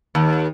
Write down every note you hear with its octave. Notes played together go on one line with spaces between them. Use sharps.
D#2